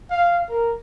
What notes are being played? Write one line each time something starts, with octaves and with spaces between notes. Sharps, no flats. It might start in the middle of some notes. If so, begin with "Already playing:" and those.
F5
A#4